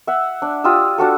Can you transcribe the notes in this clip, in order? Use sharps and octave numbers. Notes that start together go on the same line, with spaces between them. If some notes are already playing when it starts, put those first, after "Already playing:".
E5 F#5
D4
F4 G4 D#6 E6
D4 F#4 A4